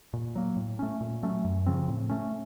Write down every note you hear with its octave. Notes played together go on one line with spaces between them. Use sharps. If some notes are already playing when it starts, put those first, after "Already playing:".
A#2
F#3 A#3
A2
A3 C#4
A#2
F#3 A3 C#4
F#2
C#3 F3 C4
A2
A3 C#4